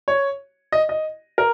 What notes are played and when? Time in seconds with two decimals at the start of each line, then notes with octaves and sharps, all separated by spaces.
0.08 C#5
0.72 D#5
0.89 D#5
1.38 A#4